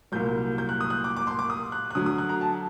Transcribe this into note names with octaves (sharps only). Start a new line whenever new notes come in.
C2 A#2 F#3 G6
G6
F#6
D#6
F#6
D6
D6
C6
D6
D#6
F#6
F#6
D2 D3 F#3 D#6
D#6
F#6
A#5
A5